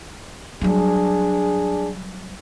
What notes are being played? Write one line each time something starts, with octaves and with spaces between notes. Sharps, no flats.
F#3 G3 D4 G#4